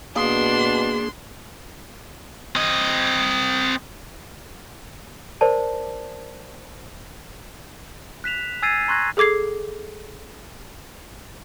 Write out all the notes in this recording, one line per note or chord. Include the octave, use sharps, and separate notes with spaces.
B2 A#3 D4 G#4 C6
C4 D#5
A#4 C5 D5 A5
F#6 B6 E7 F7
G#5 E6 G#6 A6 C7 D#7
A#5 C6 C#6 F#6 G#6 A#6
G#4 A4 D6 G#6 C7